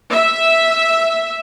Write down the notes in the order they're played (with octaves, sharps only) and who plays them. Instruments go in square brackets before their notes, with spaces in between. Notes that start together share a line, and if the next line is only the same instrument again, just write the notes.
[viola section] E5